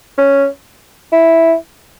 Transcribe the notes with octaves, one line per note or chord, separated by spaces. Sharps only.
C#4
E4